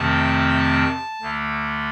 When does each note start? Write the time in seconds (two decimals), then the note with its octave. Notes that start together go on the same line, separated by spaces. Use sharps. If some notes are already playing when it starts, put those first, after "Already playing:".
Already playing: F2 C3 D#3 A3 C4 A5
1.21 D2 D3 A3